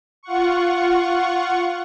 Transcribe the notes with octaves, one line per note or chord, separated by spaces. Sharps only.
F4 F#5 C#6